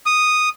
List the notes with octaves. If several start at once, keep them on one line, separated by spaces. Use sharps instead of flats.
D#6